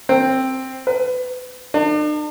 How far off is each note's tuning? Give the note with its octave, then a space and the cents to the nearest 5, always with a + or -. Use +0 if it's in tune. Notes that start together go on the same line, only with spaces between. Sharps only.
C4 +5
B4 +30
D4 +45